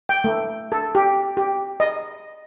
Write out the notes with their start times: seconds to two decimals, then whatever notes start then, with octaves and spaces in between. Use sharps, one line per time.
0.09 G5
0.24 A3
0.72 A4
0.95 G4
1.37 G4
1.80 D#5